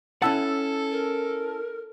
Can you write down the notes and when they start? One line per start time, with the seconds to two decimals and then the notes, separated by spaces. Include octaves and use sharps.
0.22 C#4 E4 A4 F#5 A5 E6
0.91 A#4